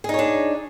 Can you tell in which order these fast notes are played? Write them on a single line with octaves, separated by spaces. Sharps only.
G#4 D#4 C#5 D4